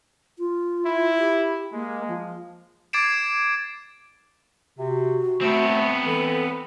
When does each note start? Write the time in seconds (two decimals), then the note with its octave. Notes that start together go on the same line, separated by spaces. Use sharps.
0.38 F4
0.85 E4
1.18 G4
1.73 G#3 A#3
2.08 F3
2.93 D6 G#6 A6 C7 D7 E7
4.78 C3 F#4
5.41 A3 B3 C4
6.06 E3 A4